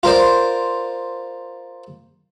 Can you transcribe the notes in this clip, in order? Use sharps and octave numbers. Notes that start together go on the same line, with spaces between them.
F4 A#4 C5 D5